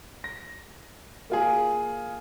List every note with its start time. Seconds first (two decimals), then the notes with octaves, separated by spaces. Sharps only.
0.24 A#6
1.30 A#3 F4 G#4